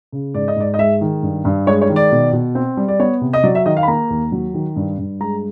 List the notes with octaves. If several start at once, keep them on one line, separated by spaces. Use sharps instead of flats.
C#3
G#2 D5
D#5
G#2 D5
D#5
G#3 E5
D#3
G2
G2
G#3 C#5
C#5
D#3
D5
B2
B2
C4
G3
D5
B3 C#5
C3
D#5
F#3 D5
E5
D#3 D#5
F5
B5
A#3 A#5
D#2
F#3
D#3
G2
G2
G#3 A#5